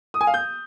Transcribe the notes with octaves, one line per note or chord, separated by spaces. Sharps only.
D#6
G#5
F5
G6